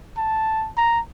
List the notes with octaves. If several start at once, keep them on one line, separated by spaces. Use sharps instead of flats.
A5
A#5